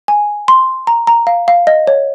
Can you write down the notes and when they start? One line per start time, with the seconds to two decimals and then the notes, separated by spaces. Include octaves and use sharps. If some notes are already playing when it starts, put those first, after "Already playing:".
0.08 G#5
0.48 C6
0.87 A#5
1.07 A#5
1.27 F5
1.48 F5
1.67 D#5
1.87 C#5